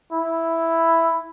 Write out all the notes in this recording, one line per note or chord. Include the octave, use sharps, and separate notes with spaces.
E4